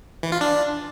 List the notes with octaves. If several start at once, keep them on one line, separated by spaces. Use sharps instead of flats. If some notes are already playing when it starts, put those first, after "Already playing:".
E3
F4
D4